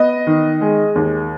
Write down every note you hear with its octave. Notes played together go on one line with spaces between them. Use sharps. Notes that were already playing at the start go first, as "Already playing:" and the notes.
Already playing: B3 D#5
D#3
G#3
D#2